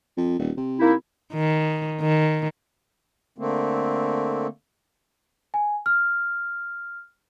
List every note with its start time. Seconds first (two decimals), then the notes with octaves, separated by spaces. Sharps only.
0.17 F2
0.39 D#1
0.57 C3
0.80 A#3 D#4 E4
1.33 D#3
2.01 D#3
3.38 D3 A3 A#3 C4
5.54 G#5
5.86 F6